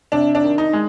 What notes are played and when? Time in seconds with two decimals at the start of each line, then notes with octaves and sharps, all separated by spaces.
0.12 C3 D4
0.35 D4
0.42 D#3
0.58 D#4
0.73 G#3